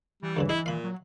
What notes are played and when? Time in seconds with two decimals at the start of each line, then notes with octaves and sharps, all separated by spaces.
0.23 E3 G3
0.36 D2 G2 C#3
0.49 E4 G#4 D#5
0.66 A#2 F5 B5
0.84 F#3